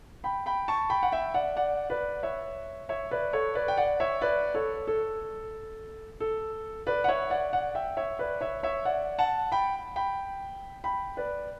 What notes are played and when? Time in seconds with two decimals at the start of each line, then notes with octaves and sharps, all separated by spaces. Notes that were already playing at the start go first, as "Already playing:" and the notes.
0.24 G5 B5
0.46 G5 B5
0.68 A5 C#6
0.90 G5 B5
1.03 F#5
1.12 E5 G5
1.34 D5 F#5
1.56 D5 F#5
1.90 B4 D5
2.23 C#5 E5
2.89 C#5 E5
3.11 B4 D5
3.33 A4 C#5
3.55 B4 D5
3.68 G5
3.77 D5 F#5
4.00 C#5 E5
4.22 B4 D5
4.55 A4 C#5
4.87 A4
6.20 A4
6.87 B4 D5
7.04 F#5
7.08 C#5 E5
7.30 D5 F#5
7.53 D5 F#5
7.75 E5 G5
7.97 C#5 E5
8.19 B4 D5
8.41 C#5 E5
8.63 C#5 E5
8.85 D5 F#5
9.19 F#5 A5
9.52 G5 B5
9.96 G5 B5
10.84 G5 B5
11.17 B4 D5